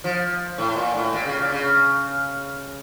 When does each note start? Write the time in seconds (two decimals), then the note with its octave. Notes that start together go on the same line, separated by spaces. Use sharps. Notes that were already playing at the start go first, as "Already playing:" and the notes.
0.04 F3
0.58 A2
0.76 A#2
0.95 A2
1.13 A#2
1.26 C#3
1.39 A#2
1.52 C#3